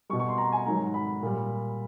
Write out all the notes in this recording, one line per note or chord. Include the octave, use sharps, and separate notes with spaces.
B2 G3 C#6
C#6
C6
A#5
G#5
G#2 D#3 F#3 A#5
B5
A#2 G3